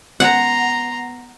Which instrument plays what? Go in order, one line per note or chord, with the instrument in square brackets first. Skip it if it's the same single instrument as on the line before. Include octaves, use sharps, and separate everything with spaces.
[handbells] B3 [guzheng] F#5 [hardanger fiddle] A#5 C6